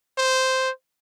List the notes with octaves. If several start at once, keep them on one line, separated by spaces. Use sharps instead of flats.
C5